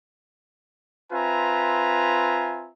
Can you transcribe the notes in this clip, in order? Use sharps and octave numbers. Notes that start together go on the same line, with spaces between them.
C4 F4 B4 E5 G#5 A#5